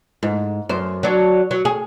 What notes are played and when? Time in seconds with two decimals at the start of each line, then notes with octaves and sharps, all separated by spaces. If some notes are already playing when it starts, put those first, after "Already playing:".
0.23 G#2
0.69 F#2 C5
1.03 F#3 D4
1.51 F#3
1.65 G#4